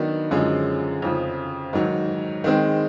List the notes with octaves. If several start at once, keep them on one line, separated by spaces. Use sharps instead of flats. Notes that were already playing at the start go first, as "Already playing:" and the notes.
Already playing: D#3 F#3 B3 D4
F#2 D3 F3 G#3 C#4
F2 C#3 F3
G#2 D#3 F#3
D#3 G#3 C4